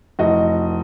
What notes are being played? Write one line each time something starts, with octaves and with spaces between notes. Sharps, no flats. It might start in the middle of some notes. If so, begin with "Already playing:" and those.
F1 E3 F#4 D#5